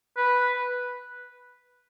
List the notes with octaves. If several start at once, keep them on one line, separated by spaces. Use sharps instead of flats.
B4